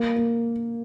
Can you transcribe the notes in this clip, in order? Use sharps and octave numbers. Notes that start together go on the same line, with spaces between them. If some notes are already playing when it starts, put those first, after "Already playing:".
Already playing: A#3
A#3